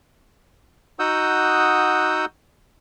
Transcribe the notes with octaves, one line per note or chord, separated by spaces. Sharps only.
D#4 F#4 F#5 D#6 E6 G6